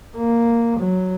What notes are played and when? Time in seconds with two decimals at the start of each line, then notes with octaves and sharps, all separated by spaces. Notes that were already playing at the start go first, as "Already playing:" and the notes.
0.16 A#3
0.79 F#3